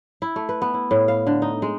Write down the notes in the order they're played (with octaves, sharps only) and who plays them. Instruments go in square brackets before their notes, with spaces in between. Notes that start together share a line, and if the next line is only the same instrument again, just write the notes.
[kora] E4
A3
B4
B3
E4
A2
F5
D3
D#4
G#3